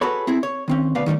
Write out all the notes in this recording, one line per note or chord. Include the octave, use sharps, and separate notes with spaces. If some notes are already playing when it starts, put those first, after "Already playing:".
F#4 G#4 A4 B4 C#5
C4 E4 G#4
C#5
D#3 C4 C#4
D2 B2 B3 B4 D5 F5
D#3 G3 A3 C#4